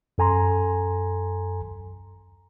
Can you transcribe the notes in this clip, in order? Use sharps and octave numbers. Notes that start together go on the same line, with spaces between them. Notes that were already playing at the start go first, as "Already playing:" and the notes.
F#2 A4 G#5 A#5 C6